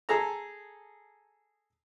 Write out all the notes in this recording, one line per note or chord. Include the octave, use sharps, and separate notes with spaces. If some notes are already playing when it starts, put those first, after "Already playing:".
G#4 A4 A#5